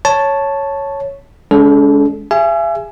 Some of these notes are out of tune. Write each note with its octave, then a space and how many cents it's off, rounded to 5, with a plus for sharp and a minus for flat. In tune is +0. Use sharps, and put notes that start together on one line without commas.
C#5 +0 A5 +0
G#3 +0 C#4 +45 A4 -30
G#4 -45 E5 +40 G#5 +10